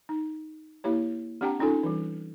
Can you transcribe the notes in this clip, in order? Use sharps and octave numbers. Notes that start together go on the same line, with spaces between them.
D#4
A#3 E4 G4 C#5
C4 D4 G4 F#5 G5 A#5
C#4 D#4 F4 A4 G#5
E3 G3